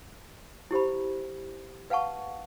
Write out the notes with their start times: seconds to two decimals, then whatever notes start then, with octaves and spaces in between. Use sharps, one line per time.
0.71 E4 G4 C5 B5
1.90 B4 F5 F#5 A5 C#6